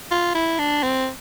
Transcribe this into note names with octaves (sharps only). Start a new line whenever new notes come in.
F4
E4
D4
C4